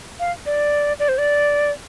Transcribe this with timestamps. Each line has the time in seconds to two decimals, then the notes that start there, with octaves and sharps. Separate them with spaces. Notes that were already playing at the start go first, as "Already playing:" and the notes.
0.20 F5
0.46 D5
0.99 D5
1.09 C5
1.18 D5